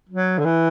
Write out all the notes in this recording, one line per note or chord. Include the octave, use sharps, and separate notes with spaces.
F#3
D3
E3